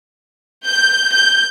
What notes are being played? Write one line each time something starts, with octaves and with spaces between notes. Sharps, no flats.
G6
G6